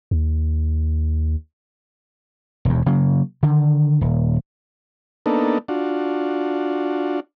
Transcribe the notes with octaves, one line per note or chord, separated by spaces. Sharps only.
D#2
E1 D#2
C#3 F#3 A#3
D3 D#3
D#1
A#3 B3 D4 D#4 A4
D4 F4 F#4